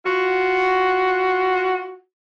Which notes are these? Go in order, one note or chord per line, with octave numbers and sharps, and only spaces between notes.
F4 F#4